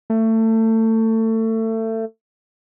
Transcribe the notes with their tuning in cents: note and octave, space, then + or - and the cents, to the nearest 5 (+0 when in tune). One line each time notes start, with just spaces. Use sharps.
A3 +25